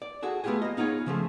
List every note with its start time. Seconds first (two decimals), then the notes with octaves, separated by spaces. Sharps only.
0.02 D5
0.22 F#4 G#4 A4
0.44 A3 B3 D4 F4 G4 G#4
0.62 A#3 D#5
0.77 B3 D#4 F4 G#4 C#5
1.06 C#3 F3 A3 G#4